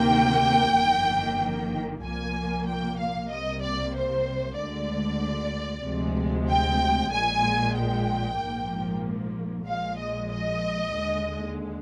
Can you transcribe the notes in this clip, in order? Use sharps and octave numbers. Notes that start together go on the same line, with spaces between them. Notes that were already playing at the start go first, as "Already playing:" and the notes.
Already playing: D2 C3 D#3 A#3 G5
G1 F2 D#3 A#3
C2 A#2 F3 A#3 G#5
G5
F5
C2 C3 G3 A#3 D#5
D5
C5
D2 D3 G#3 D5
D2 C3 F3 G#3
G5
A#1 A#2 G#3 G#5
G5
A#1 G#2 F3 A#3
A#1 A#2 F3 G#3 F5
D#5
D#5
D#2 D3 G#3